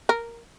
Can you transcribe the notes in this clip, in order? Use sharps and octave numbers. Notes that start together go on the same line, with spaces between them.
A#4